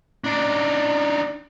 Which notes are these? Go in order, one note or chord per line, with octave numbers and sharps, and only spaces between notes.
D4 D#4